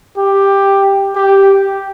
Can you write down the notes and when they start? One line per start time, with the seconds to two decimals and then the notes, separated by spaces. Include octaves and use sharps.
0.18 G4
1.16 G4